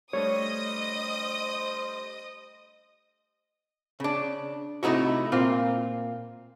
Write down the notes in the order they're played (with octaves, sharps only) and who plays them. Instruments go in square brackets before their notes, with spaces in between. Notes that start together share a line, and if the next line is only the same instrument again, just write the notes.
[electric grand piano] G3 A3 D4 [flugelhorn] C5 [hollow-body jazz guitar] C#5 [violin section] D#5 D#6
[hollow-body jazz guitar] C#3 D4
C3 A3 D#4 E4 F#4
A#2 A#3 C4 F4